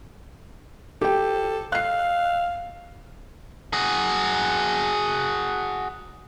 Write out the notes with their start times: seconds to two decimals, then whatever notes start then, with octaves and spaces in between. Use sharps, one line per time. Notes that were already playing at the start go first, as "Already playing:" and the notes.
1.02 G4 A4 G5
1.72 F5 F#6 C7
3.73 F#4 G#4